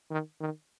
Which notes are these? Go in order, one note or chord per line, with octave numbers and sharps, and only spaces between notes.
D#3
D#3